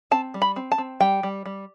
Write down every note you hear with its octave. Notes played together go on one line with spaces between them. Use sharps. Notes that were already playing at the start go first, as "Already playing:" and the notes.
C4 A5
G3
B5
C4
A5
C4
G3 G5
G3
G3